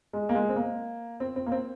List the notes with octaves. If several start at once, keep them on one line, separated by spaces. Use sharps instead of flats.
G#3
A#3
G#3
C4
A#3
C4
C4
A#3
C4